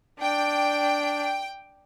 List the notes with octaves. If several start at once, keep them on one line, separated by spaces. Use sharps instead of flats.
D4 G5